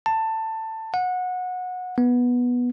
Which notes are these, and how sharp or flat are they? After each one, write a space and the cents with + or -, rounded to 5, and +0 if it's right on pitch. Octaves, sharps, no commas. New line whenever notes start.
A5 +15
F#5 -20
B3 -10